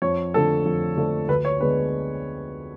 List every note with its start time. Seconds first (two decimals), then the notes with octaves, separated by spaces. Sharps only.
0.02 F2 C#5
0.34 D3 F3 A3 D4 A4
0.65 F2
0.96 D3 F3 A3 D4
1.28 D2 B4
1.45 C#5
1.60 D3 G#3 B3 D4 B4